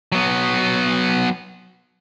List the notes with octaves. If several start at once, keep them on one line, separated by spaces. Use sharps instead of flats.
F#3 B3